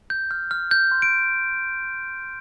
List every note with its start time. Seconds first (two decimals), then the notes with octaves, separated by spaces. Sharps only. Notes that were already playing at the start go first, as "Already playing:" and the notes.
0.10 G6
0.31 F6
0.51 F6
0.71 F6 G6
0.91 C6
1.02 D7